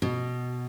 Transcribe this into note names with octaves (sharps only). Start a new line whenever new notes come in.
B2